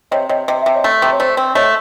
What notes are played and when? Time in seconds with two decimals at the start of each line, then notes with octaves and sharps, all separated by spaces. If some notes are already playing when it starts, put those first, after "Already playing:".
0.11 C3 C#5 D#5
0.29 C3 C#5 D#5
0.48 C3 D#5
0.62 C3 E5
0.75 C#5 D#5
0.84 A3
1.02 C3
1.13 C#5
1.20 A3 C5 D5
1.37 C4
1.55 A3 C#5 D#5